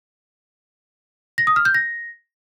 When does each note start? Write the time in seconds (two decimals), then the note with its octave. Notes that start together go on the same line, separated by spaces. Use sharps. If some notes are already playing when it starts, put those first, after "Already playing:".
1.38 A#6
1.47 D#6
1.56 F6
1.65 G6
1.74 A#6